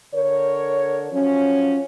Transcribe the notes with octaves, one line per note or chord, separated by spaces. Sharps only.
D3 A#4 C#5
F3 F#3 C#4